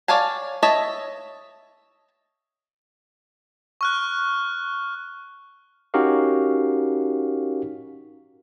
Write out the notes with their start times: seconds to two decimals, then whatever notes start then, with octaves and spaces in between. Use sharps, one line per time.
0.08 C#5 D5 F5 G#5 A5
0.63 C#5 D#5 E5 A5
3.81 C#6 F6 F#6
5.94 C#4 D#4 F#4 G4 A#4 F5